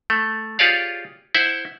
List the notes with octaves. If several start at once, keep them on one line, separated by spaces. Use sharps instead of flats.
A3
F4 G4 G#4 C#5 D5 F5
E4 C5 E5 F#5